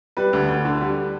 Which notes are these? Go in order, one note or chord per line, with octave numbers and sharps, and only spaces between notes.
G3 B4
D2
D2
D3
G3